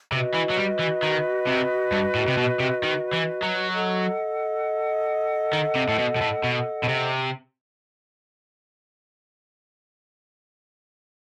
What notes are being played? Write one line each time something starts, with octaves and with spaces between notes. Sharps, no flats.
C3 F#4 B4 D#5
E3
F#3
G3
E3
D#3
C3
G2
A2
C3
B2
C3
D#3
E3
F#3
A4 D#5 F#5
D#3
C3
A2
B2
B2
A2
B2
B2
C3